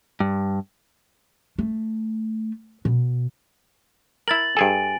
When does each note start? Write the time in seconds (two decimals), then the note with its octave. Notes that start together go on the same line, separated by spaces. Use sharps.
0.20 G2
1.59 A3
2.85 B2
4.28 E4 A#4 A6 F#7
4.57 G2 G#4 A4 G#5 D7